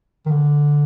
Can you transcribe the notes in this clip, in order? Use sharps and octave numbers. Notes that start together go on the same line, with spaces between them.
D#3
D3